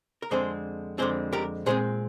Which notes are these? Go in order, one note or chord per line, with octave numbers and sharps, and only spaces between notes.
A#4
F2 D3 G#3 C4 G#4 C5
F2 D3 G#3 C4 G#4 C5
G4 A#4
A#2 G#3 C4 G#4 C5